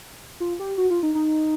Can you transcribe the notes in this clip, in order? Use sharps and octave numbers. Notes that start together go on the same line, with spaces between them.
F4
G4
F#4
F4
D#4
D#4